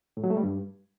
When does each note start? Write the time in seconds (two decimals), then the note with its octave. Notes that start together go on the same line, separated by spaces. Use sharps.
0.17 A2
0.24 F#3
0.30 A3
0.37 G3
0.43 G2